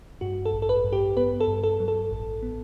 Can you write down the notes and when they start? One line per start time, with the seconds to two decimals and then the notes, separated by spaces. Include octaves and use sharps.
0.21 G2 F#4
0.45 A4
0.53 A1
0.62 A4
0.69 B4
0.84 G2
0.93 G4
1.17 B3 B4
1.40 A4
1.48 G2
1.64 A4
1.80 F#3
1.88 A4
2.11 A1
2.43 B3